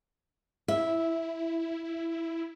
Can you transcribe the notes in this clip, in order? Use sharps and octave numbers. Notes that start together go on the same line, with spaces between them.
E4 E5